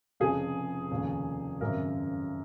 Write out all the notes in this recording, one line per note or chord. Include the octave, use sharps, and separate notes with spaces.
F1 F2 C#3 G#4
F1 D#2 C#3
G#1 F#2 C#3 A#4